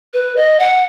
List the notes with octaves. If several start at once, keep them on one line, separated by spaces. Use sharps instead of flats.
B4
D#5
F#5